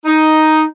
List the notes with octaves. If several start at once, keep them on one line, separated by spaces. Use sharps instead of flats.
D#4